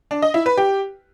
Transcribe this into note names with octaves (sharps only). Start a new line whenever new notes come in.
D4
D#5
E4
B4
G4